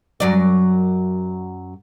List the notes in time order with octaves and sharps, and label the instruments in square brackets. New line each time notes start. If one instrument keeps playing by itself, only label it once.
[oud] F#2 F#3 D5